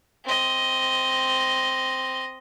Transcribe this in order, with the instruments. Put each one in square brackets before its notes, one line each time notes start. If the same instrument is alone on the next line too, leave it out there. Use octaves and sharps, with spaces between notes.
[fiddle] C4 D#5